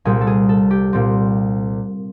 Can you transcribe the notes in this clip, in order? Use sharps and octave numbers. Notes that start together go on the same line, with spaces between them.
C2 A#2 G3 C4 G#4
A4
G#4
A4
G4
C2 A#2 G3 C4